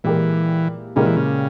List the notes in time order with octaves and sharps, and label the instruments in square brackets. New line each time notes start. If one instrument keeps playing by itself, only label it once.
[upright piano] A#2 G#3 E4 G4 A#4 [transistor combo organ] E3
[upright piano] A#2 G#3 E4 G4 A#4 [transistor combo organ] C#3
[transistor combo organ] E3
C#3